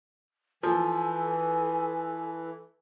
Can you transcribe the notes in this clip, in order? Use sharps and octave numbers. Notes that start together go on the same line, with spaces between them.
E3 F3 A4 G#5